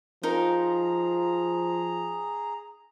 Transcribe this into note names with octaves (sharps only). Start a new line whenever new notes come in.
F3 D#4 G#4 A#4 A#5